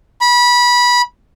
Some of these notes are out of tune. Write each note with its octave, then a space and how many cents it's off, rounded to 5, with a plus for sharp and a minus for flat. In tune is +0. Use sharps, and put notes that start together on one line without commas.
B5 -20